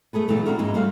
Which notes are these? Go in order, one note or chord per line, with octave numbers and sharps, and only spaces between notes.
A3 G#4 A4 B4
A#2 E3 F#3 A3 B3
C4 D4 E4 F#4 A4 A#4
F2 G#2 G#3 A#3 C#4
G3 A3 F#4 C5 C#5 F5